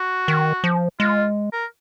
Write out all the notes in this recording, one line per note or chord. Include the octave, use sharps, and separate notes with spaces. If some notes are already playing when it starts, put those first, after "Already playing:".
Already playing: F#4
D#3
F3
G#3 F4
A#4